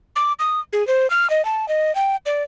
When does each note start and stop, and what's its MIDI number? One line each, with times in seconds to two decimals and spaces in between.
0.16 0.33 86
0.39 0.60 87
0.73 0.85 68
0.87 1.09 72
1.10 1.30 89
1.30 1.44 75
1.45 1.68 81
1.68 1.94 75
1.95 2.16 79
2.26 2.43 74